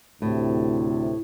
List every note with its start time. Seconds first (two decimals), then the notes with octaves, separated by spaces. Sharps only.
0.22 D2 A2 C3